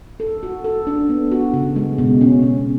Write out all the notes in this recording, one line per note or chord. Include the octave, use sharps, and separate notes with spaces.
A4
F#4
A4
D4
B3
F#4
C#3
G#3
B2
C#4
B2